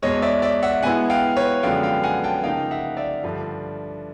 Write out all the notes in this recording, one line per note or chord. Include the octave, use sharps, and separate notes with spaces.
E2 B2 G#3 C#5 D#5
D5 E5
D5 E5
E5 F#5
B2 G#3 B3 E4 F#5 G#5
F5 G5
B4 C#5
F#2 D3 F3 G#3 B3 F5 G5
F5 G5
F#5 G#5
G5 A5
C#3 F3 A#3 D#4 F5 G5
E5 F#5
D5 E5
G2 D3 F3